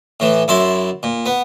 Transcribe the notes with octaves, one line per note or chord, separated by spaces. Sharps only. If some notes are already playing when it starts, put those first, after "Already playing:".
A2 E3
F#2 E4 D5 C6
A#2
B3